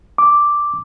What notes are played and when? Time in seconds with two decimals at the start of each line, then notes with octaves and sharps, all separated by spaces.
0.18 D6